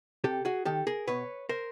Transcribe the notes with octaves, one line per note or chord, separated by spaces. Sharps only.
C3 G4 A4
F#4 G#4
D#3 G4 A4
G#4 A#4
B2 B4 C#5
A#4 C5